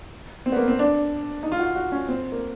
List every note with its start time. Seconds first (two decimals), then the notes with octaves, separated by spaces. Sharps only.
0.46 C4
0.52 B3
0.56 A#3
0.68 C4
0.79 D4
1.43 D#4
1.52 F4
1.59 F#4
1.75 F#4
1.92 C#4
2.08 C4
2.32 A#3